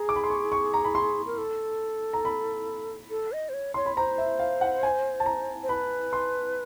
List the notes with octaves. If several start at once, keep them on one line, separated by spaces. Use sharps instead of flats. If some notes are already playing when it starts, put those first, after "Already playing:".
Already playing: G#4 A#5
D6
B5
C6
C#6
C#6
A#5
B5
C6
A#4
A4
A#5
B5
A4
D#5
C5
C#5
C#5 C6
B5
C5 A#5
E5
F5
F#5
G#5
A5
A#5
C5
B4 B5
C6